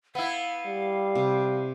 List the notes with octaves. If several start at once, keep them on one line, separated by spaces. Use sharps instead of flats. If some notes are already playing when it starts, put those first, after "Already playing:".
B3 E4 F5
G3
C3